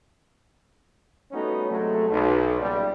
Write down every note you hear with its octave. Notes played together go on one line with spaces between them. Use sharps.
G3 A3 B3 C#4 D#4 F#4
C3 F#3 G#3 A3
B1
B1 A#2 C#3 G3